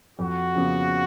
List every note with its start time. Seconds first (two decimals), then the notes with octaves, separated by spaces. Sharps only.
0.19 F2 F#4
0.55 C#3 F3 B3